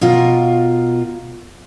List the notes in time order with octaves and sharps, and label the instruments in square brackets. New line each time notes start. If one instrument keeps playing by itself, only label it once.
[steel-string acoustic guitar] B2 F4 A#4